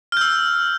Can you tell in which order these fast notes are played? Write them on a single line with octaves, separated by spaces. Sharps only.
F6 G6 E6